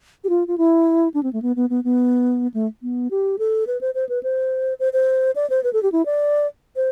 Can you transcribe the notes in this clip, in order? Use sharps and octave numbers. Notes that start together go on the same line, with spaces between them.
G4
F4
F4
E4
D4
C4
A3
B3
B3
B3
B3
A3
B3
G4
A4
B4
C5
C5
B4
C5
C5
C5
D5
C5
B4
A4
G4
E4
D5
C5